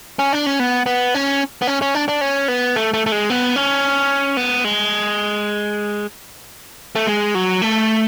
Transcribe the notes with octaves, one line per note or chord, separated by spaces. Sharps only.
C#4
D4
C#4
B3
B3
C#4
B3
C#4
C#4
D4
D4
C#4
B3
A3
A3
A3
G#3
B3
C#4
B3
G#3
A3
G#3
F#3
A3